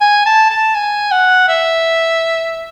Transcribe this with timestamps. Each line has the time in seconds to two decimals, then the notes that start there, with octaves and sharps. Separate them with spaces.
0.01 G#5
0.26 A5
0.50 A5
0.75 G#5
1.11 F#5
1.48 E5